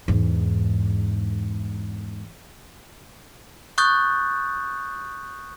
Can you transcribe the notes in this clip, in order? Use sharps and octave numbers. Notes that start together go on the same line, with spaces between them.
E2 G#2
C#6 D#6 F#6 G6 A6